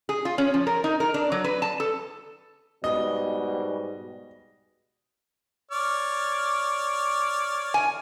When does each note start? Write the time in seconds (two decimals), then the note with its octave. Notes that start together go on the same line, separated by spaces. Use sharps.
0.09 G#4
0.25 F4
0.38 C#4
0.54 F3
0.67 A#4
0.84 D#4
1.00 A#4
1.14 D4
1.32 F#3
1.44 B4
1.62 A5
1.80 A4
2.84 G#2 B2 G3 D#5
5.72 C#5 D5 F6
7.74 G#5